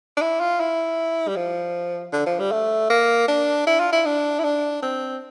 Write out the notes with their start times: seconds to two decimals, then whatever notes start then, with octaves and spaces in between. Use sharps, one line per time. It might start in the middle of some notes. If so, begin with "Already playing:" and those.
0.17 D4
0.21 E4
0.40 F4
0.60 E4
1.28 G3
1.36 F3
2.13 D3
2.26 F3
2.39 G3
2.51 A3
2.90 A#3
3.28 D4
3.67 E4
3.80 F4
3.92 E4
4.06 D4
4.39 E4
4.44 D4
4.82 C4